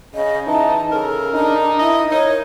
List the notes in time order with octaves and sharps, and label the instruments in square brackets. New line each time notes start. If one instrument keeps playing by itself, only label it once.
[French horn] C#3 [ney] D#5
[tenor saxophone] E3 [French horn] D#4 [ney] A5
[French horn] C#3 [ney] A4 [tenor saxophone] A#4
[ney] D4 [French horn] D#4
[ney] E4 [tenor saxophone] D#5
[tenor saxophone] D#4 [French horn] A#4 [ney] C#5